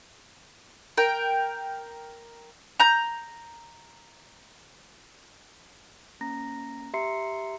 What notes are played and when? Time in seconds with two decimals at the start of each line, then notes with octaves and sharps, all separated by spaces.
0.97 A#4 G5
2.80 A#5 G6
6.21 A#3 C#4 A#5 A#6
6.94 G4 E5 A#5 C6 C7 C#7